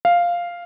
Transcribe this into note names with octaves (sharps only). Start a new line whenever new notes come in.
F5